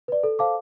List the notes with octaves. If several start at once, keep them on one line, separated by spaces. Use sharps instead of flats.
B4 D5
A4
C5 F5 A5 D6